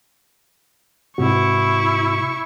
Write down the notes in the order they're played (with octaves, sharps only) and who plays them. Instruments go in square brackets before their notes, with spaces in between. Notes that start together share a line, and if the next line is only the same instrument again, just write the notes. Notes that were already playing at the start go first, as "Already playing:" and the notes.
[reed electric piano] G#2 C3 F#4 [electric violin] E4 C#6